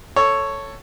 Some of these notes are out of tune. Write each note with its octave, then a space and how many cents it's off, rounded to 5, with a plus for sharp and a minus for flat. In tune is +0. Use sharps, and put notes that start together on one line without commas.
A4 +10 C#5 +0